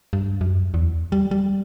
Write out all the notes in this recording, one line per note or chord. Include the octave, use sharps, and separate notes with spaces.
G2
F#2
E2
G3
G3